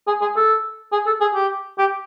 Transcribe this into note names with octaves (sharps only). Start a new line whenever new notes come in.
G#4
G#4
A4
G#4
A4
G#4
G4
G4